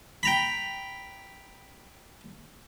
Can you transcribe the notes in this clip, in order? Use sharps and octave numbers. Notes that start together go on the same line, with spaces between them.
G5 A#5 B5